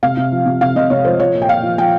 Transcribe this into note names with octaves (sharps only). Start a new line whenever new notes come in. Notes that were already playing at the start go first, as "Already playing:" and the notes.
C3 F5
C3
F3
C3
C3 F5
C3 D#5
C3 C#5
F3 C5
F3 C#5
A#2
G5
A#2 F5
F3
F3 G5